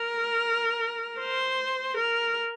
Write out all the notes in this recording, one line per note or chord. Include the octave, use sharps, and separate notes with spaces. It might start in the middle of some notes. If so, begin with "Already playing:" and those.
Already playing: A#4
C5
A#4